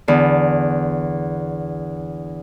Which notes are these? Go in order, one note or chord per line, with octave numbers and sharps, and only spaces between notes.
E2 D3 D5